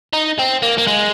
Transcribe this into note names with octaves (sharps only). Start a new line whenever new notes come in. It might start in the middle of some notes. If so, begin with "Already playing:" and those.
D#4
C4
A#3
A#3
G#3